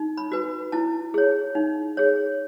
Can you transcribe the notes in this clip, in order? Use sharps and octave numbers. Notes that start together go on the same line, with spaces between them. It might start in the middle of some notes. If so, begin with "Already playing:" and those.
Already playing: D#4
B5
F#4 B4
E4 A5
G#4 C#5
D#4
G#4 C#5